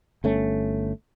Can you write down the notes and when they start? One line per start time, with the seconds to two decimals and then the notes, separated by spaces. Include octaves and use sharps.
0.24 G1 A3 C#4